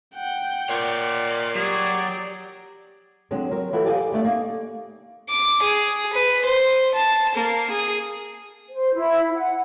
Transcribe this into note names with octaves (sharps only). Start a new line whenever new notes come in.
F#5 G5
A#2 C#5 D5
F#3 G4 G#4 D5
D3 F#3 G#3 C4
F#3 A#4
E3 E4 F#4 A4 C#5
G4 A4 D5 D#5 F5 G#5
D3 A3 D5
A#3 D#4
D6
G#4
B4
C5
A5
A#3
G#4
C5
E4
F#5